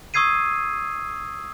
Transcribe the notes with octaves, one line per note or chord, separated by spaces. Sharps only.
C#6 D#6 E6 G#6 C7 D#7